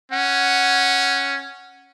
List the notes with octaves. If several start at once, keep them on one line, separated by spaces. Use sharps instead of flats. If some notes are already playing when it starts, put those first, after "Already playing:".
C#4 F#5